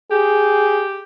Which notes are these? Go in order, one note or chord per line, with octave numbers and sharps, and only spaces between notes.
G4 G#4